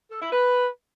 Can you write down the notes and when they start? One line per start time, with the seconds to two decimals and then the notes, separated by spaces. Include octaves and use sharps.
0.10 A4
0.21 E4
0.32 B4